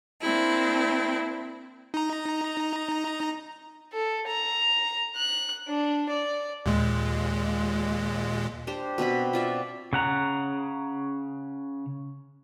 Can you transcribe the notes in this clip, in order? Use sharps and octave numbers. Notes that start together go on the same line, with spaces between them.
A#3 C4 D4 E4
D#4 A#5
A4
A#5
F#6
D4
D5
D#2 A#2 G#3
D4 G4 C5
B2 C4 B4 B5
F4 D5 E5
C#3 F#5 A#5